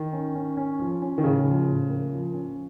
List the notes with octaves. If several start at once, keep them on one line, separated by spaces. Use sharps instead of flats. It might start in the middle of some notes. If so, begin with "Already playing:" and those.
Already playing: D#3
C#4
C#4
C#4
F3
C#4
D#3
A2 C#3
F3
A2
A#3
F3
C#4